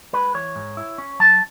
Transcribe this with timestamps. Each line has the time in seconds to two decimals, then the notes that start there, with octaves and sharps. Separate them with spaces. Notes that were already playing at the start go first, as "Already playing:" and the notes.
0.13 G#3 B4
0.34 E3 C#5
0.56 G#2
0.77 E4
0.98 C#4
1.20 F#3 A5